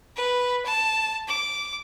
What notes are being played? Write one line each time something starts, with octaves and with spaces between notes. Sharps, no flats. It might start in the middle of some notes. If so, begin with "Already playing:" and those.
B4
A5
D6